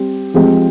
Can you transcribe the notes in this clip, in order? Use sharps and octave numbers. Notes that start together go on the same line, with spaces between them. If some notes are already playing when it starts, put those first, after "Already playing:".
Already playing: G3 C4 G4
F3 G#3 C4 G4